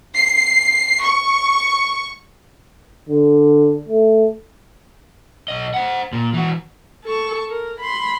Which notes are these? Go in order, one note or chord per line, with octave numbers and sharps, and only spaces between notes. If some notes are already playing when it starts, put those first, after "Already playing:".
C7
C#6
D3
A3
B1 D#5
C5 F#5
A#2
E3 F#4
A4 C#6
A#4
B5 C6